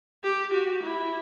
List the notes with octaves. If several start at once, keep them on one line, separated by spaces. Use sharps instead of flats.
G4
F#4
E4